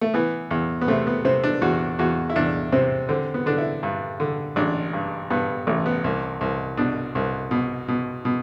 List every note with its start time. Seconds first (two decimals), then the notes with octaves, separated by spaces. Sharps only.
0.01 A3
0.14 E3 B3
0.51 E2
0.81 B3
0.88 C3 A3
1.07 B3
1.25 C3 C4
1.44 D4
1.62 E2 F#4
1.99 E2 F#4
2.30 E4
2.36 E2 D4
2.72 C3 C4
3.09 D3 C4
3.34 B3
3.46 D3 D4
3.58 E4
3.83 G2
4.20 D3
4.56 A1 D4
4.93 G2
5.30 G2 B3
5.67 A1 A3
5.86 B3
6.04 C2
6.41 C2
6.77 B2 D4
7.15 C2
7.51 B2
7.88 B2
8.25 B2